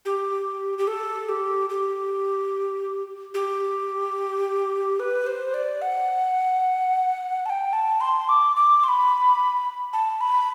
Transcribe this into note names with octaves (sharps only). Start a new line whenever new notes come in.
G4
G4
A4
G4
G4
G4
B4
C5
D5
F#5
A5
G5
A5
C6
D6
D6
C6
B5
A5
B5